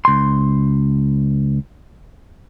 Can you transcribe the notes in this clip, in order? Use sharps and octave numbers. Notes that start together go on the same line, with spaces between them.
C#2 C6